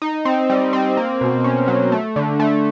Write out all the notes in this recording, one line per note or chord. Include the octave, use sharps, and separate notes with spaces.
D#4
C4
G3
C4
A#3
B2
C#4
F#3
A3
D3
A3